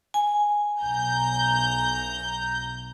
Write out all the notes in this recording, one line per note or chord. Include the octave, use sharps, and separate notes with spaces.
G#5
B1 A#5 G6